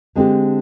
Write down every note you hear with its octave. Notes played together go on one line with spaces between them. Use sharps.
D3 G#3 C4 G4